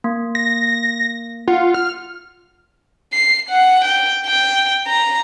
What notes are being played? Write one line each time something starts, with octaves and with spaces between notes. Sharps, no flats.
A#3
A#6
F4 F#5
F6
C7
F#5
G5
G5
A#5